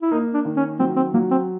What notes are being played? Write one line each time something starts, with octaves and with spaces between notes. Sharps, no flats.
E4
A#3 D#4
D4
D#3
C#4
F#3 C4
C4
F#3 A#3
C4